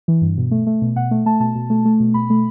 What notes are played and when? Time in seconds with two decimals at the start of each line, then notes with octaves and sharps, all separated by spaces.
0.08 E3
0.22 G2
0.37 B2
0.51 A3
0.67 A3
0.82 B2
0.96 B2 F#5
1.11 A3
1.26 A3 A5
1.40 B2 A5
1.55 B2
1.70 A3
1.85 A3
2.00 B2
2.14 B2 B5
2.30 A3